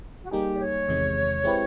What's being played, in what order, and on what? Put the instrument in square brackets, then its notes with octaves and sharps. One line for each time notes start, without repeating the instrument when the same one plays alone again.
[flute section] F#4
[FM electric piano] G3 A#3 D#4 G#4 [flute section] G4
[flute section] D5
C#5
[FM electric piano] E2 C3 D#3 G#3
G#3 C4 E4 G4 B4